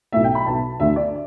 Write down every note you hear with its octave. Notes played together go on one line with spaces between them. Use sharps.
B1 A2 A3 E5
G5
B5
B1 B2 B3 A5
D2 D3 A3 E5
D5